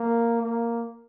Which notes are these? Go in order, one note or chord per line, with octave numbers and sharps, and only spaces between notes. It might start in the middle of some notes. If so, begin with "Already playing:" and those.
Already playing: A#3
A#3